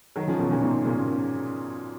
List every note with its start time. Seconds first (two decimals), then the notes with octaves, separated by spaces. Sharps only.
0.16 D#3 F#3
0.27 C#3 F3
0.39 B2 D#3
0.51 A#2 C#3
0.62 G#2 B2
0.85 A#2 C#3